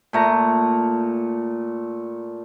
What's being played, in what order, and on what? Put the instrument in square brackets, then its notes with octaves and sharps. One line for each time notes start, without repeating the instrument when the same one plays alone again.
[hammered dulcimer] A#2 A3 A#5